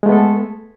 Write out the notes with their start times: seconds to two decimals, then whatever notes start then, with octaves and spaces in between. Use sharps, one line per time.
0.03 G#3
0.06 A3
0.09 B3
0.12 A4